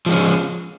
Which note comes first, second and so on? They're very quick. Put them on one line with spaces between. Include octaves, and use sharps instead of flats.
F3 G#3 C#4